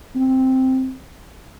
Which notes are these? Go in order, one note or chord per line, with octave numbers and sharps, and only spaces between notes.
C4